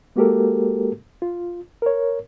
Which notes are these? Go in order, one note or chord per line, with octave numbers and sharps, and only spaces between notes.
G#3 A#3 F#4 G4 A4 A#4
F4
A#4 C#5